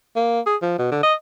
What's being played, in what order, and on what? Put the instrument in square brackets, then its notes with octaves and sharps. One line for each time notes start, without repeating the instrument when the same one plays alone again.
[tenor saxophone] A#3
G#4
F3
B2
D3
D#5